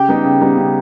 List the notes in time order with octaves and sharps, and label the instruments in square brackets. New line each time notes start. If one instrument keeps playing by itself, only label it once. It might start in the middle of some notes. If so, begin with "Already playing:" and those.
Already playing: [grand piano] C#3 [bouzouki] G4
[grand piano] G3 B3 D#4
C#3
G3 B3 D#4
C#3